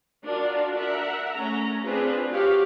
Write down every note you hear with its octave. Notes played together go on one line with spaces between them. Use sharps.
D4 F4 F#4 A#4
A#4 E5 F#5
A3 C#4 A#5
C4 D4 F4 G#4 B4
F#4 G4 C#5 F5